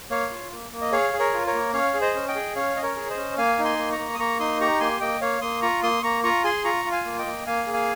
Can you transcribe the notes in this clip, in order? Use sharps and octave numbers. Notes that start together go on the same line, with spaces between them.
A#3 C#5 F5
F4
A#3
A#3
D#5
G#4 C#5 F5
G#4
A#4 C#5
F4
A#4 C#5
A#3
C#4 C#5 F5
G#4
C5 D#5
C#4
D#5 G5
G#4
C#4 C#5 F5
C#4 D#5
A#4 C#5
G#4
C5 D#5
C#4
A#3 F5 G#5
D#4
G#5 C6
A#3
A#5 C#6
A#3
D#6
A#3 A#5 C#6
D#4 C6 D#6
G4 A#5 C#6
A#3 G#5 C6
A#3 D#5 G5
A#3 C#5 F5
A#3 C6 D#6
F4 A#5 C#6
A#3 C6 D#6
A#3 A#5 C#6
F4 A#5 C#6
G#4 G#5 C6
F4 A#5 C#6
F4
F5 G#5
A#3
D#5 G5
A#3
A#3 F5 G#5
G#4
F5 G#5